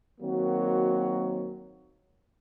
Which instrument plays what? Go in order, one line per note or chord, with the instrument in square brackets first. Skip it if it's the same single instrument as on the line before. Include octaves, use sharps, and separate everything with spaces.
[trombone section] D#3 F#3 A#3 C4 F#4